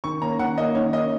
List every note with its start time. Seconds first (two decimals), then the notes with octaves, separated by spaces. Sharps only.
0.04 D#3 C#6
0.22 A#3 C#4 A#5
0.39 D#3 F#5
0.57 A#3 C#4 D#5
0.75 D#3 C#5
0.93 A#3 C#4 D#5